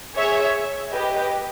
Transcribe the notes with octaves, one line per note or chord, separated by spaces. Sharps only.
G#4 C#5 E5
G4 B4 D#5